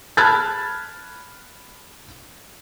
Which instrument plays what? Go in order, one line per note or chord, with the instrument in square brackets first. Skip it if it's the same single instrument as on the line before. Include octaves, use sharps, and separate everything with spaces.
[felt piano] A5 B5 F6 F#6 G#6 A6